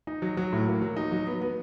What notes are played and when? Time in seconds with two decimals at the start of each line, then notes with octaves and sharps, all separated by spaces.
0.07 D#4
0.22 F#3
0.37 F#3
0.53 A2
0.67 A#3
0.82 F#3
0.96 D#4
1.12 F#3
1.27 B3
1.42 B3